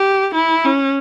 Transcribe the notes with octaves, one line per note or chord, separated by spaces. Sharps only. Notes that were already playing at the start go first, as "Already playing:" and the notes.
Already playing: G4
E4
C#4